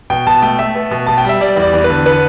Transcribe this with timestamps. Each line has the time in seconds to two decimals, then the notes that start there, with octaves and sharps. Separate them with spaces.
0.10 B2 G5
0.27 B2 A5
0.42 A3 G5
0.59 A3 E5
0.75 B3
0.91 B2
1.07 B2 A5
1.18 G5
1.25 G3 E5
1.41 G3 D5
1.56 E2
1.62 D5
1.73 E2
1.84 B4
1.90 D3
2.06 B3 B4